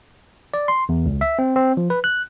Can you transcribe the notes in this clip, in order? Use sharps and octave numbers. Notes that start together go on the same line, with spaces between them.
D5
C6
E2
C#2
E5
C4
C4
F3
B4
F#6